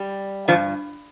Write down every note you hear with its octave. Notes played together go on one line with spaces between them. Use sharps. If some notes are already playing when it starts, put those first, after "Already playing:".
Already playing: G3
G2 F3